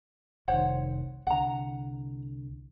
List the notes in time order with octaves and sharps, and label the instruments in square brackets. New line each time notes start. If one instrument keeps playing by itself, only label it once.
[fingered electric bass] F1 C2 D#3 [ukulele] C5 C#5 F#5
[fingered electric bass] C2 D3 [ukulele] F#5 A#5